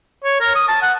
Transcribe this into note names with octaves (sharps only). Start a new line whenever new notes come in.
C#5
A#4
D#6
A5
F#5